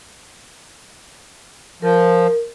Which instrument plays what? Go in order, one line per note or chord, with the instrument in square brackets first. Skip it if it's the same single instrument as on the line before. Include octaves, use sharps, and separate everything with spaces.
[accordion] F3 [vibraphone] A#4